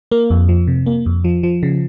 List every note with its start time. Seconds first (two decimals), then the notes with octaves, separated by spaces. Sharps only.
0.11 A#3
0.30 F2
0.49 F3
0.67 C3
0.86 A#3
1.06 F2
1.24 F3
1.43 F3
1.63 C#3